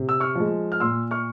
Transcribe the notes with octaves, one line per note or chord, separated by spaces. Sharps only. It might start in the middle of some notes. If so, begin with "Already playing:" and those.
Already playing: C3
E6
C#6 F6
F3 G#3
F6
A#2 C6 E6
C#6 F6